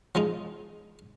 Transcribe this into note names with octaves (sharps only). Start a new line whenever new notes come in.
F3 G#3 D#4